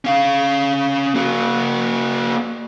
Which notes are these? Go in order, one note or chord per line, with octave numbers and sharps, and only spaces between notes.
C#4 F5
A#3 F#4